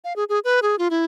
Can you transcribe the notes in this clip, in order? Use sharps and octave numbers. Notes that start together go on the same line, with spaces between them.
F5
G#4
G#4
B4
G#4
F4
E4